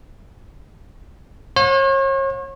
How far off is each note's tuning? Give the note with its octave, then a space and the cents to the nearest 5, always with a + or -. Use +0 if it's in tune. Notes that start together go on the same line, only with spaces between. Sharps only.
C#5 -40 F#5 -45